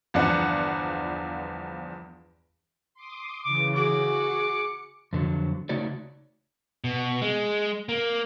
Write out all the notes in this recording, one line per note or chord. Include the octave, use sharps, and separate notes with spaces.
G1 E2 F3 D4 D5 F#5
C6 D6 D#6
C#3 E3 D6
F#4 G#4 D6
C#7
F2 D3 F#3
C#3 A3 D#4 F#4 C#5 D5
B2
G#3
A#3